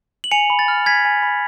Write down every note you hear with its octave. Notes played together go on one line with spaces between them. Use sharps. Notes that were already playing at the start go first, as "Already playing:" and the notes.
F#7
G#5 C#7 F7
B5
A6
F6
G#5 G#6 B6
G#5
B5